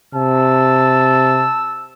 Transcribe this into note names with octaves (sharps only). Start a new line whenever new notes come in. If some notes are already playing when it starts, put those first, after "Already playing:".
C3 A5 E6